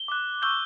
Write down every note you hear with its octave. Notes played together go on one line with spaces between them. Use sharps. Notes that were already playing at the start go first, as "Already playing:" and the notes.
Already playing: G7
D6 F#6
C#6 E6 G6 G7